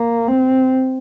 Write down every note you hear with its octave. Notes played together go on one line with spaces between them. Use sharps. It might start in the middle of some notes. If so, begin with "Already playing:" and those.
Already playing: A#3
C4